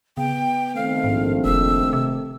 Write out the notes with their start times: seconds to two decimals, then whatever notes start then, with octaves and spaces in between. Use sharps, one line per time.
0.17 C#3 B3 G5
0.75 D#3 A3 C4 F5
1.04 A#1 G#2
1.45 F1 E6
1.93 C3